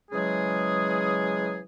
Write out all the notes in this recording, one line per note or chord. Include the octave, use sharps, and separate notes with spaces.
C#3 E3 F#3 G#3 G#4